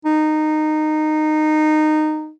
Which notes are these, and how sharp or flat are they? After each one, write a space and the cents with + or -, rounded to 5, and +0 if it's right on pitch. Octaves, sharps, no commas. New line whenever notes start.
D#4 -15